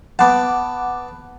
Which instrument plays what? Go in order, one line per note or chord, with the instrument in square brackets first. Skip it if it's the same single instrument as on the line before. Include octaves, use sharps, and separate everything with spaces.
[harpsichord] B3 A5 [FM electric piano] F#5 D6